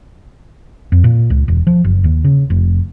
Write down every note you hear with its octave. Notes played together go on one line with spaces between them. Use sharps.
F2
A#2
C#2
E1
F3
F#1
D#2
C#3
F1